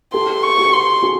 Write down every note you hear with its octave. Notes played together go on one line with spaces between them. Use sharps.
G4 A4 C6
C#6
F#4 G#4
C6
F#4 G#4